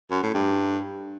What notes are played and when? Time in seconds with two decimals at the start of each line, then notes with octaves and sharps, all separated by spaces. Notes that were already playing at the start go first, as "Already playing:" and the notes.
0.11 F#2
0.23 A2
0.34 G2